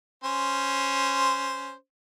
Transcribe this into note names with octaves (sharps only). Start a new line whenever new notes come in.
C#4 C5